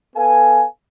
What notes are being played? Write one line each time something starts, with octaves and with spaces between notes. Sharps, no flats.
B3 A4 B4 F5 G#5